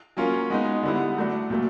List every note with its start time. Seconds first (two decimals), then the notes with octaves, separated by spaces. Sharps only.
0.17 F#3 A#3 C#4 F4
0.50 G#3 B3 D#4
0.83 D3 G3 B3 E4
1.16 F#3 A3 D4 F#4
1.50 A#2 F#3 A3